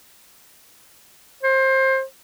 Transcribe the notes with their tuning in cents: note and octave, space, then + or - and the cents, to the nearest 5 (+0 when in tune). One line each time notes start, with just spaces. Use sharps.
C5 +25